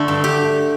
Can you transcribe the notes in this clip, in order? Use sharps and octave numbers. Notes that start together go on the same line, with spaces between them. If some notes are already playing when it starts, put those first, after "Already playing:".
Already playing: D3 A3 D4
G2
G4